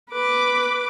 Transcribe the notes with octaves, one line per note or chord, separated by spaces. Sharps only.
B4 D6